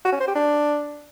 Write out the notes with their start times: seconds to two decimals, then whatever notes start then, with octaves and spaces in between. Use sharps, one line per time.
0.05 F#4
0.12 C#4
0.20 C5
0.28 G4
0.35 D4